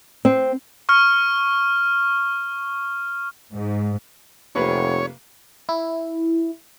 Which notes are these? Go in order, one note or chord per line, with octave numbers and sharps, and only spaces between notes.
C4
C#6 F6
G#2
F1 C3 A#3 B4 C#5
E4